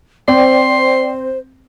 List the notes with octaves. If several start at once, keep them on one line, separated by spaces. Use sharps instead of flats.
C4 C5 D5 G5 C6